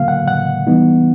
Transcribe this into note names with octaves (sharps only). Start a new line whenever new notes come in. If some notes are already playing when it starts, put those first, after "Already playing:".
Already playing: D3 F#3 A#3 F5
F#5
F#5
E3 G3 B3 D#4